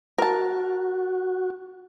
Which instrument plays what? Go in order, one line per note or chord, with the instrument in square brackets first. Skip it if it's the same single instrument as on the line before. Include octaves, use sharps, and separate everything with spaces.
[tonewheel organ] F#4 [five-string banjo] A#4 A5